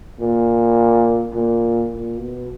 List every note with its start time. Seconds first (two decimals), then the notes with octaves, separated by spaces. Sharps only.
0.20 A#2
1.33 A#2
1.91 A#2
2.19 B2